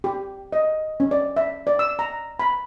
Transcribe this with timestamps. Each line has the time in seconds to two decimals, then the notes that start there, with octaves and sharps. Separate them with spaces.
0.04 G4
0.53 D#5
1.00 C#4
1.11 D5
1.37 E5
1.67 D5
1.79 E6
1.99 A#5
2.39 B5